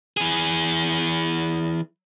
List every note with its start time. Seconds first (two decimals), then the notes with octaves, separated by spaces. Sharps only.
0.17 E3 G#4